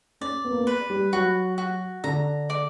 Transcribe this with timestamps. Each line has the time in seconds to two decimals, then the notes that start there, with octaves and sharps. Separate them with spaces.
0.21 C#4 D5
0.45 B3
0.51 A#3
0.59 B3
0.67 B4
0.90 G3
1.13 F#3 F#4
1.58 F#4
2.04 D3 A#5
2.50 D5